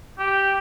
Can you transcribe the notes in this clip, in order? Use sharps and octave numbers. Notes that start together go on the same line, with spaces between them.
G4